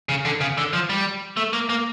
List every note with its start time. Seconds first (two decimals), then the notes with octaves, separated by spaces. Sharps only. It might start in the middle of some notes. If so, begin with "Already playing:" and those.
0.09 C#3
0.25 D3
0.41 C#3
0.58 D3
0.73 F3
0.89 G3
1.37 A3
1.53 A#3
1.69 A#3